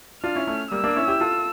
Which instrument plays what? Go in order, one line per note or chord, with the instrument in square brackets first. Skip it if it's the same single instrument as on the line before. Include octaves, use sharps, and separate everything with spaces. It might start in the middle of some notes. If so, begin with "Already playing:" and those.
[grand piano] D4 F4 [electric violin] F6
[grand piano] C#4 E4
A3 C#4
[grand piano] G3 A#3 [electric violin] E6
[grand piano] A#3 D4
C#4 E4
E4 G4
F4 A4